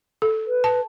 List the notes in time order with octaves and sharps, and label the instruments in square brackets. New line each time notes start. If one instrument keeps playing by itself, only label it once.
[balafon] A4
[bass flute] B4
[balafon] A5